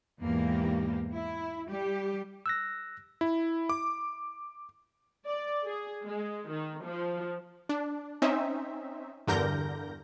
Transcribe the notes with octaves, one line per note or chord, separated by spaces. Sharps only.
E2 G#2 E3 A#3 G4
E4
G3 G4
E6 F#6 A#6
E4
D6
D5
G#4
G#3
D#3
F3
D4
C4 C#4 D#4 E5
E2 G2 D3 A#4 G6 A#6